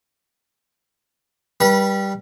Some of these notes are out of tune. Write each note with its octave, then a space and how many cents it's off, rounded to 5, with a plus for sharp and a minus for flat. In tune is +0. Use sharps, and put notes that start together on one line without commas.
G3 +0 B4 -35